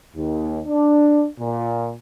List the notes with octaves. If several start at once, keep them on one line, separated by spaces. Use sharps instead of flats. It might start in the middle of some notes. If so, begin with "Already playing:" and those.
D#2
D4
A#2